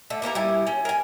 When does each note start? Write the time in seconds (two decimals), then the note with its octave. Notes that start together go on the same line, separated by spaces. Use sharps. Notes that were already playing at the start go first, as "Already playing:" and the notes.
0.10 D3 A3
0.22 A#3 B3 G4 A#4
0.35 G3 E4 G#5
0.67 C#4
0.85 A#4 G#5